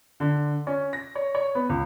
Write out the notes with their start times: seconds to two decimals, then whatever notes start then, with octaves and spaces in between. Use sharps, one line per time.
0.20 D3
0.67 C#4
0.93 A#6
1.15 C#5
1.35 C#5
1.55 B3
1.69 C#2